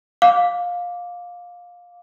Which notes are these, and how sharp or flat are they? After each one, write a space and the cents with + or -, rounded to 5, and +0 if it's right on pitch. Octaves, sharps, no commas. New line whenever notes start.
F5 +20 D6 -10